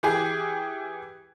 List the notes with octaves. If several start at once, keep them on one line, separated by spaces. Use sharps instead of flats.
E3 G4 G#4